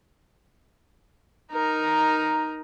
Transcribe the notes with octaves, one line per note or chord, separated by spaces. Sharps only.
D#4 A#4